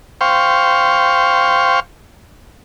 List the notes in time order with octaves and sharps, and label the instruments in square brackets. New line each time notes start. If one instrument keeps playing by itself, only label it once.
[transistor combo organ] C5 F5 G5 C#6